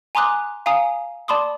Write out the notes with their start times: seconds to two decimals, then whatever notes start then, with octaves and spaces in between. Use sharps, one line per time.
0.15 G#5 A#5 C6 D6 D#6 F#6
0.66 F5 G#5 A#5 D#6 C7
1.28 D5 A5 B5 C6 D6 D#6